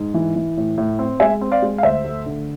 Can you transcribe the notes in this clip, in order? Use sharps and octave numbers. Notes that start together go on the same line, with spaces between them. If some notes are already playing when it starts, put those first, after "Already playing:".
Already playing: G#2
E3
E3
A2
A2
C4
G#3 E5 G#5
C4
D5 F5
G#3
F5
D2 C5 E5
A3
D3